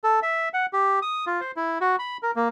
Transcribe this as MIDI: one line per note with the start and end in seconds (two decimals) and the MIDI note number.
0.04 0.20 69
0.22 0.49 76
0.54 0.66 78
0.73 0.99 67
1.02 1.25 87
1.27 1.41 65
1.41 1.52 72
1.56 1.78 64
1.81 1.96 66
1.99 2.17 83
2.23 2.31 70
2.36 2.48 58